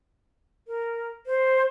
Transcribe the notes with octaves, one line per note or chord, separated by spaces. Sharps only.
A#4
C5